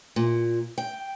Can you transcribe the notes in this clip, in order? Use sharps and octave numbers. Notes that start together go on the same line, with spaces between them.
A#2
G5